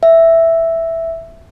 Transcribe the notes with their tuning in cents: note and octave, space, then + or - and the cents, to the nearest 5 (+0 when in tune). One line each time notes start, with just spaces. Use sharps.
E5 +0